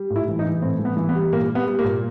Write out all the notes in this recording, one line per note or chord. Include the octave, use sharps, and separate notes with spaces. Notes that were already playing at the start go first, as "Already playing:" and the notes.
Already playing: G3
A2
E4
E3
D#4
E3
A2 C4
E3
B3
E3
B3
G3
A#2 A#3
G3
B3
G3
A#3
A#2